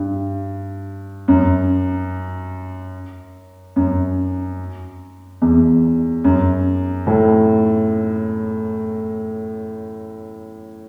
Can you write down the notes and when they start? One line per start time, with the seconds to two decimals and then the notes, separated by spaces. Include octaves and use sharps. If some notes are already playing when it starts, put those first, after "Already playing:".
Already playing: G2
1.28 F#2
3.76 F#2
5.42 E2
6.24 F#2
7.07 A2